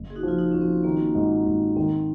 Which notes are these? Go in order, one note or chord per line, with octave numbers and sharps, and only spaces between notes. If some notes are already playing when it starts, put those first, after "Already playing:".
Already playing: F#1
G#4
D#4 F#4
F3 F4
D#4
F3 C#4
C4
D#3 A#3
G#2
G#2
D#3 C4